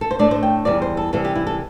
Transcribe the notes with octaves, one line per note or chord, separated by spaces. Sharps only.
A4
C5
A2 A3 D4 D5
C5
G5
E2 E3 G3 D5
C5
A4
C3 E3 G3 A4
G4
E4
A4